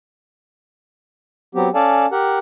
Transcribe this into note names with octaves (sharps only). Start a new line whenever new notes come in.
F#3 B3 C4 G4
C#4 A4 D5 F5 G#5 A5
G4 A#4 F#5